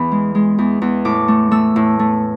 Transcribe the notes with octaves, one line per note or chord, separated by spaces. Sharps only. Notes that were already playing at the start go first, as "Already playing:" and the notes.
Already playing: E2 E3 B5
G#3
G#3
E2
E2
A2 D6
A3
A3 E6
A2
A3